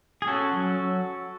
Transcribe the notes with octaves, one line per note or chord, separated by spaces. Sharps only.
G#4
C#4 F#4 A4
F#3